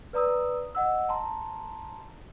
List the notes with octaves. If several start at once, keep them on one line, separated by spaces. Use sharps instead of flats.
B4 D5 A#5 D#6 E6
D#5 F#5 E6
A5 A#5 C6